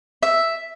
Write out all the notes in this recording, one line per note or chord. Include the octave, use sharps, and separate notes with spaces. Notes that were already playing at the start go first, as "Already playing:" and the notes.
E5